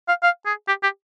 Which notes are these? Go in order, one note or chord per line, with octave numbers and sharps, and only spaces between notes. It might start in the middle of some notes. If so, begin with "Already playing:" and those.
F5
F5
G#4
G4
G4